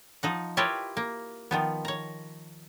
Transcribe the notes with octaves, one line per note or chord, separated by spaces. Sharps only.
F3 D#4 F#5
E4 F4 G4 A#4 B4 C#5
A#3
D#3 F3 B3
C#5 A#5